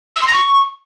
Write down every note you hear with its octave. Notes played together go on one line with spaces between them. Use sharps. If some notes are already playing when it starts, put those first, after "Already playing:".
E6
C6
A#6
C#6